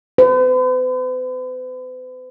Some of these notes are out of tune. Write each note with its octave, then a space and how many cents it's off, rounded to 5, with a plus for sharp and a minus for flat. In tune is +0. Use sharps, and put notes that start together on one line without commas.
B4 +45